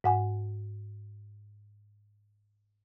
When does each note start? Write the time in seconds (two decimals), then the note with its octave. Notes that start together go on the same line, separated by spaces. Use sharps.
0.04 G#2 F#5 G#5